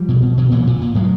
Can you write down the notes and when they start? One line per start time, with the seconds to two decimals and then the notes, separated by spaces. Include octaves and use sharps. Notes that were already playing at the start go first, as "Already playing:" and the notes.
Already playing: F3 G3
0.09 B2
0.22 B2
0.38 B2
0.51 A#2 E3 F#3
0.67 A#2
0.82 A#2
0.95 A2 F#3 G#3